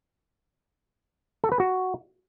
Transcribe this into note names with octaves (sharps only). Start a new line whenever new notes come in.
A4
B4
F#4